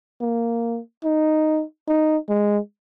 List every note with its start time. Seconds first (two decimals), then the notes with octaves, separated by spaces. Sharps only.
0.21 A#3
1.04 D#4
1.88 D#4
2.29 G#3